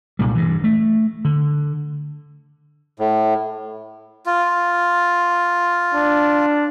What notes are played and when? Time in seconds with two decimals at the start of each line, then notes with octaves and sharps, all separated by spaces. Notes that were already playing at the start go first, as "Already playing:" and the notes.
0.19 C2 A#2 G3
0.35 G2 E3
0.64 A3
1.25 D3
3.00 A2
4.26 F4
5.94 D4